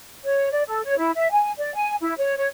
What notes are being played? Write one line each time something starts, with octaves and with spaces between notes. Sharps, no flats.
C#5
D5
A4
C#5
E4
E5
G#5
D5
G#5
E4
C#5
C#5